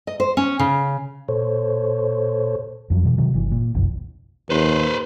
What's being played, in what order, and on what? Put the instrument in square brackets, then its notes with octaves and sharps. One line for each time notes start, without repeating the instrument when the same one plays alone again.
[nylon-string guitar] D#5
C5
C#4
C#3
[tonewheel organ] A#2 A4 C5 C#5
[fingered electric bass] F2 F3 F#3
B2 E3
C3 D#3 F#3
G1 E3
A#2
F#1 B1 F2 E3
[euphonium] D#2 [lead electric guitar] B4 C5